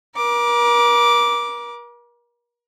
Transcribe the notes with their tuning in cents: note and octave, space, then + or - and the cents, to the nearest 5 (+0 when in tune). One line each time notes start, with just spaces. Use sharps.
A#4 +40 D6 +0